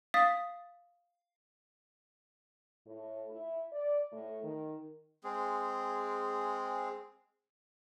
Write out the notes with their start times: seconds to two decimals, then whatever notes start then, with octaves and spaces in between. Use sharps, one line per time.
0.14 F5 D#6 A6 B6
2.86 A2
3.29 E4
3.72 D5
4.11 A2
4.43 D#3
5.24 G#3 C4 G#4